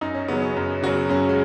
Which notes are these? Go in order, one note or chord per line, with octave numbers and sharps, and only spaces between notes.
F#2 D#4
C#4
C#3 F#3 B3
C#4
F#2
C#3 F#3 F#4
F#2 C#4
G#3